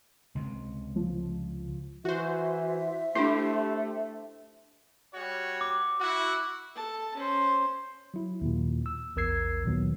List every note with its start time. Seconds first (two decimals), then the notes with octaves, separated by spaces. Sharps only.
0.35 C#2 C3
0.96 F3
2.05 E3 F#4 C5 E5
3.15 A3 D4 E4 G4 C5
5.14 G3 F#4 C#5
5.61 D6
6.00 E4 F#4
6.75 A4 A5
7.16 C#4 C5
8.14 F#3 E4
8.42 D#2 A#2
8.86 E6
9.16 A#1 E2 A#4 E6 G#6 C7
9.64 D2 A#2 D#3 F#3 B3